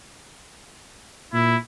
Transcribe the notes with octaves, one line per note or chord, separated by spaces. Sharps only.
A#2 E4